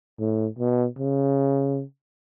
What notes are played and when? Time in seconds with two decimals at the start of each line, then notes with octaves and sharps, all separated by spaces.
0.19 A2
0.59 B2
0.99 C#3